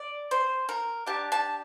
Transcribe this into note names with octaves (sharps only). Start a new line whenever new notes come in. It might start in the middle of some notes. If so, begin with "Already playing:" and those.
Already playing: D5
C5
A#4
D4 G4 A5
A5